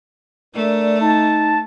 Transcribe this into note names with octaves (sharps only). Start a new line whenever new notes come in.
A3 D4 A#4 D5
D#4 A5